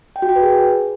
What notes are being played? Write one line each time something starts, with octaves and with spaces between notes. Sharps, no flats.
G5
F#4
G5
B4
G#4